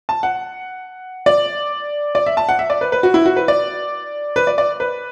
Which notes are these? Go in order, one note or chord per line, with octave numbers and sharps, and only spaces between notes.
A5
F#5
D5
D5
E5
A5
F#5
E5
D5
B4
B4
F#4
E4
F#4
B4
D5
B4
D5
D5
B4